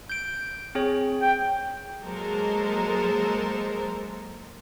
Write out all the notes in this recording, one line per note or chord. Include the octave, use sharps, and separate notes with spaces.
G6 D7
C4 G#4 C#5
G5
F#3 G#3 A#3 A4 A#4 C5